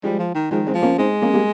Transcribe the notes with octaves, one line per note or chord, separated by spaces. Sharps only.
F3 G3 G#3
F3
D#3
D#3 F3 G#3
G#3 C4
F3
A#3 C#4
G#3 C4 D#4
A#3 C#4
G3 A#3